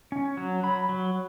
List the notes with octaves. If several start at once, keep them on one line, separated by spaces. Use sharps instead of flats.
C#4
F#3
F#3 B5
F#3